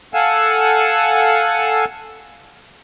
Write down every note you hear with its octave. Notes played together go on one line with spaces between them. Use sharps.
A4 F5 F#5 G#5 E6